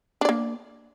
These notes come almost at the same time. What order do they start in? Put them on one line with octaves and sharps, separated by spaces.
D4 D5 A#3